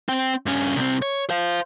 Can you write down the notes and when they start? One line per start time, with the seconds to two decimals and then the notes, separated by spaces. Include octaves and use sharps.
0.09 C4 G5
0.46 G2 C#4
0.76 C2 C4
1.02 C#5
1.30 C5 F5